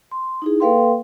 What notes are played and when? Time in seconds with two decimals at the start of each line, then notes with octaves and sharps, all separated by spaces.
0.11 C6
0.42 D#4 E4 G#4
0.60 A#3 A4 B4 F5 G5 C6